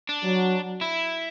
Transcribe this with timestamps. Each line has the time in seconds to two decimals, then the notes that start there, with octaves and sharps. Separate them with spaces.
0.09 D4
0.23 F#3
0.81 E4